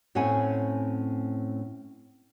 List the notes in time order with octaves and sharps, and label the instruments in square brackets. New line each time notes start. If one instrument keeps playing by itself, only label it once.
[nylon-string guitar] A2 C4 C#4 C#5 F#5 G#5